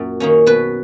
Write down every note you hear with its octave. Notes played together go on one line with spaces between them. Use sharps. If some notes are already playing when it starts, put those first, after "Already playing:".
Already playing: F#2 A#2
D#3 A#3 C#4
B2 B4